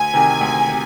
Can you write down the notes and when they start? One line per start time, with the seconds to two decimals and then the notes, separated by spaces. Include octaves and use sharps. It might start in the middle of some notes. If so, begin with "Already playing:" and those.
Already playing: D2 G#5
0.14 C3 D#3
0.41 D2
0.69 C3